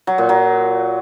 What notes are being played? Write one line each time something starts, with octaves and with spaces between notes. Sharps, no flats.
F#3
A#2
F#3